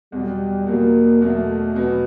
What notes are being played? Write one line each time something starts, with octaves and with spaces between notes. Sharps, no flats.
E2 B2 F#3 G3
E2 B2 F#3 A#3
E2 B2 F#3 A3
E2 B2 F#3 B3